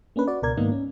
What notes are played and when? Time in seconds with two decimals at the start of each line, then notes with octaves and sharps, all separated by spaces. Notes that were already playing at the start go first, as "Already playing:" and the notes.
0.16 A#3 C#4 D4 B4
0.28 F#4 D5
0.42 C#2 B2 A#4 D5 G#6
0.57 G#2 D#3 A#3 B3 D#4
0.72 C#4